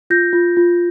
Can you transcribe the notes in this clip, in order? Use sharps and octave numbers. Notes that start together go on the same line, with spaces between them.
F4 G6 A#6
F4
F4